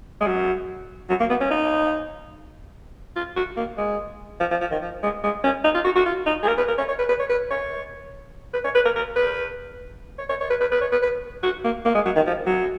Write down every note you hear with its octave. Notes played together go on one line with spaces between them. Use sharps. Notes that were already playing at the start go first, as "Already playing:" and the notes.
G#3
F#3
F#3
A#3
B3
C#4
D#4
F4
F#4
A#3
G#3
F3
F3
F3
D#3
F3
G#3
G#3
C#4
D#4
F4
F#4
F#4
F4
D#4
G#4
A#4
B4
A#4
C#5
C#5
B4
B4
C#5
B4
C#5
B4
C#5
B4
A#4
A#4
B4
C#5
C#5
C#5
B4
B4
B4
C#5
B4
B4
F#4
A#3
A#3
G#3
F#3
D#3
F3
F#3